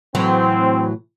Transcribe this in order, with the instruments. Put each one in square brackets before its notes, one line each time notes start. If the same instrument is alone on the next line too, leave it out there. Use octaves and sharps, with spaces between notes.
[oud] A2 E3 F#3 [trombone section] C4